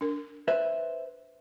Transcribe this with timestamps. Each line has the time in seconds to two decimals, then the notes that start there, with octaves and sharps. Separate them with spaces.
0.01 D4 A#4
0.48 B4 C5 E5